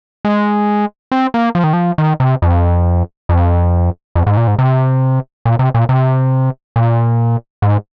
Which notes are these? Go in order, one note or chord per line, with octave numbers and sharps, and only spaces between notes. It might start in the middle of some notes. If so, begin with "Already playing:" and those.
G#3
C4
A#3
F3
D#3
F3
D#3
C3
F2
F2
F2
G#2
A#2
G#2
C3
A#2
C3
A#2
C3
A#2
G#2